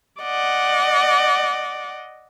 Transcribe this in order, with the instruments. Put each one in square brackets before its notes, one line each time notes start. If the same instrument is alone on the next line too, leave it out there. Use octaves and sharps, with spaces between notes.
[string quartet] D5 D#5 F#5